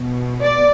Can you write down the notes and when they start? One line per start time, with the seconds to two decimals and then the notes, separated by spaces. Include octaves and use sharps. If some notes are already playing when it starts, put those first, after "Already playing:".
Already playing: B2
0.41 D5